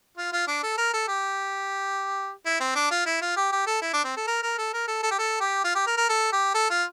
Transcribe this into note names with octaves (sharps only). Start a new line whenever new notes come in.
F4
F4
D4
A4
A#4
A4
G4
E4
C4
D4
F4
E4
F4
G4
G4
A4
E4
D4
C4
A4
A#4
A#4
A4
A#4
A4
A4
G4
A4
G4
F4
G4
A#4
A#4
A4
G4
A4
F4